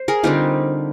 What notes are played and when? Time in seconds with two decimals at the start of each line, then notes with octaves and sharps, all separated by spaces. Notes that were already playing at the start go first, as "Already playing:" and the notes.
Already playing: C5
0.08 G#4 A#4
0.23 D3 G3 C4 D#4 F4 G4